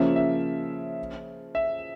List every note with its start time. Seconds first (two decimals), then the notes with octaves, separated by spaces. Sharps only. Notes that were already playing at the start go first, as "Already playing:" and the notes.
Already playing: C#3 F3 A#3 C#4 E5
0.16 E5
1.55 E5